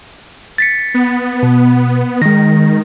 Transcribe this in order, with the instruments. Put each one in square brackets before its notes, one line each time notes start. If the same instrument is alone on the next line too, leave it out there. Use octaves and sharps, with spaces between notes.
[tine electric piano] A6 B6 C#7
[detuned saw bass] B3
[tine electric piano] B2
[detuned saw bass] D#3 [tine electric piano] G#3 A#6